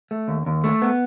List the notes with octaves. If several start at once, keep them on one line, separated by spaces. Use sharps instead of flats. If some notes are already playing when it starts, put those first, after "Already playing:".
A3
D#2
D#2
A3
B3